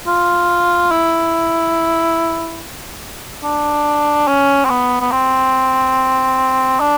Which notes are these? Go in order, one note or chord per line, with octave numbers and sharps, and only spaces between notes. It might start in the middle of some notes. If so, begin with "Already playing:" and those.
F4
E4
D4
C#4
C4
B3
B3
C4
D4